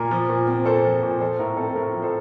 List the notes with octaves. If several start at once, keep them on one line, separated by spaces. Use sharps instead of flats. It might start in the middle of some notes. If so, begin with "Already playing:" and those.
Already playing: A#2 A#4
F3
A#2
C4
A#2 A4 C5
F3
A#2
F3 A4 C5
A2 A#4
C4 A4
A4
A2 A#4
F3
A4 C5